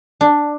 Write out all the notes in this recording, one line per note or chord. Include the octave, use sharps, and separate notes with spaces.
D4